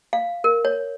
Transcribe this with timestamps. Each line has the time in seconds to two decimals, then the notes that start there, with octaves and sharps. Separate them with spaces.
0.13 F5
0.44 A#4
0.65 C#5